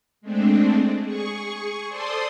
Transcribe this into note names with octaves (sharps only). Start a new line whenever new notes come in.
G#3 A3 C4 D4
G#4 C#6
A4 C5 D5 C6 D#6